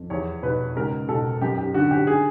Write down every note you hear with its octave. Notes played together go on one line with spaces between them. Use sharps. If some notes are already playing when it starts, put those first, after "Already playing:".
Already playing: F2
E2 C#5
B2 B4
C#2 A#4
B2 A4
F#2 G4
G4
D3 F#4
G4
G#4